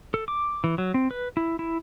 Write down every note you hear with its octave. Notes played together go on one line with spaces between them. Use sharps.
A4
D6
E3
F#3
C4
B4
E4
E4